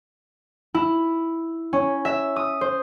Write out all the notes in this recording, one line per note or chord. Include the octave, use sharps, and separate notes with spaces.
E4
C#4
E5
D#6
C5